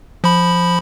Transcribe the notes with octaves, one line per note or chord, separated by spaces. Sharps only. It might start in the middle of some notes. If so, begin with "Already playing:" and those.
F3 B5